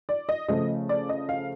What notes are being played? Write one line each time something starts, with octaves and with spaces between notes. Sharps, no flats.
D5
D#5
C#3 F3 A3 D#5
D5
D#5
F5